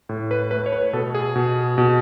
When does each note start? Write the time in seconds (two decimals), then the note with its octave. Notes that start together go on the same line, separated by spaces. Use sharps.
0.09 A2
0.31 B4
0.51 A3 B4
0.66 C#5
0.73 B4
0.93 B2 A4
1.15 G#4
1.36 B2
1.78 B2